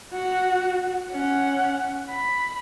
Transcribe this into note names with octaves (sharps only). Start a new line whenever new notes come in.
F#4
C#4 F#5
B5